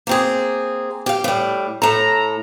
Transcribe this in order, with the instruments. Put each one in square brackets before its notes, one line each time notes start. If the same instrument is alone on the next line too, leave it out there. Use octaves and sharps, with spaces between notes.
[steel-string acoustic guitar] A#3 C4 G#4
G4 F5
A2 G3
[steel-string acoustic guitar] A2 A4 [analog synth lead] A#5